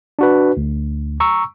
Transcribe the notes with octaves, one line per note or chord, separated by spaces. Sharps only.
D4 F#4 B4
D2
A#5 C#6 E6